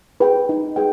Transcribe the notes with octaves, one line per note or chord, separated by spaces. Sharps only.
G#4 B4 G5
D#4
G#4 B4 G5